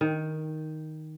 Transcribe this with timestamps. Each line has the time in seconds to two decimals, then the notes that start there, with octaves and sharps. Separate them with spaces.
0.01 D#3